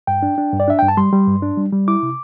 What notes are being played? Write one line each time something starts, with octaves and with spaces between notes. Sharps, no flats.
G2 G5
D4
D4
G2
D5
D4 E5
G2 G5
A5
G3 C6
G3
G2
D4
G3
G3
E4 D6
C3